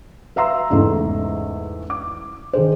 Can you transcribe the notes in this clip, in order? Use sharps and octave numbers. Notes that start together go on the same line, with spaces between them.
B4 E5 F5 A#5 C6 E6
E2 G#2 C#3 E3 A3
D6
D#3 G#4 C5